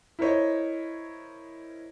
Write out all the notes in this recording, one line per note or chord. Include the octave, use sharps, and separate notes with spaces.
E4 A#4 C5 C#5 D#5